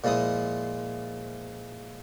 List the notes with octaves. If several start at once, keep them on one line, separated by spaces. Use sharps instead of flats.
A#2 F3 G#3 E4 D#6